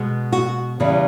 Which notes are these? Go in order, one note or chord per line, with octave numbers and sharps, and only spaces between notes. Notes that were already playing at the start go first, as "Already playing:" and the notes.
Already playing: B2 G#3 B3
F#4
E2 C#3 E3 G3